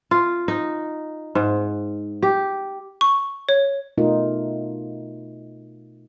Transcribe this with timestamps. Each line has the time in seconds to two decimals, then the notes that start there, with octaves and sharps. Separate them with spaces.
0.11 F4
0.48 D#4
1.35 G#2
2.23 G4
3.01 C#6
3.49 C#5
3.98 B2 A3 D#4 F4 A#4